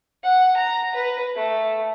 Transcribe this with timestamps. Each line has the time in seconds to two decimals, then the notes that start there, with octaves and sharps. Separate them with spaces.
0.24 F#5
0.57 A#5
0.95 B4
1.35 A3